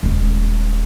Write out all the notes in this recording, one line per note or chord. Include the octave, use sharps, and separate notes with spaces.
D#1 G#3